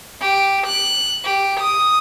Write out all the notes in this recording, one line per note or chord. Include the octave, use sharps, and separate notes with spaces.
G4
F#6
G4
D#6